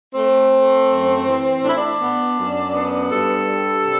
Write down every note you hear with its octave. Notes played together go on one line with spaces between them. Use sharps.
A3 C4
A3
F#2
E3
A2 D4
E4
D4
B3
F#2
B3
G2 A4
G3
C3